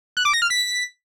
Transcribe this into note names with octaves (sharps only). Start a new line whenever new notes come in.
F#6
D6
A#6
F6
B6